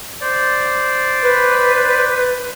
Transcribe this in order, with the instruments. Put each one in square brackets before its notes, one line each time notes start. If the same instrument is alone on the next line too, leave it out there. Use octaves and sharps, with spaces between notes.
[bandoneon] C5 D5
[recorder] B4